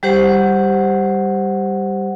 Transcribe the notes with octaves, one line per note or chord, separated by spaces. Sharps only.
G3 G4 C5 F#5